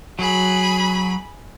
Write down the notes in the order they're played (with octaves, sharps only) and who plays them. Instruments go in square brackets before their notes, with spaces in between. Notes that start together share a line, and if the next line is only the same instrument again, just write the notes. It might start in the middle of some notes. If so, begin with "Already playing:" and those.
[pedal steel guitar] F#3 [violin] G#4 B5